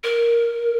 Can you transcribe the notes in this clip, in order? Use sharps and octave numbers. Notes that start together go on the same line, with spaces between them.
A#4